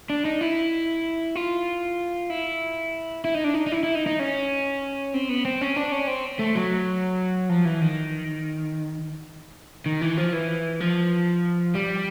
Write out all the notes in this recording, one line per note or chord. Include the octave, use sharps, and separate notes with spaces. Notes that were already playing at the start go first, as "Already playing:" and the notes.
D4
D#4
E4
F4
E4
E4
D#4
D4
D#4
D#4
E4
E4
D#4
D#4
C#4
C4
B3
C4
C#4
D4
C#4
C4
A3
F#3
F3
E3
D#3
D#3
E3
F3
E3
F3
G3